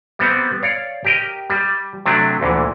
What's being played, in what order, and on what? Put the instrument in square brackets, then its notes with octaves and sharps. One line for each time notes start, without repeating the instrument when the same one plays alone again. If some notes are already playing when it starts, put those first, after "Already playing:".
[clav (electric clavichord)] G3 B3 C4
C#5 D5 F5
G4 A#4 D#5
G3
C3 F#3 A3 D4
D2 A#2 D3 E3